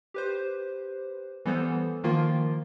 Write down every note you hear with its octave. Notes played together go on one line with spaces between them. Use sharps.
G4 B4 C5
E3 G3 B3 A4 C5
D#3 F3 A#3 F4 A#4